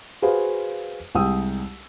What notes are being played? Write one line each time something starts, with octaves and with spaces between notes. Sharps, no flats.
F#4 G#4 B4 C5 F5
C2 G#3 G5 D#6 E6